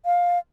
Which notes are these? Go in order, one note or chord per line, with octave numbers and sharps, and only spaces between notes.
F5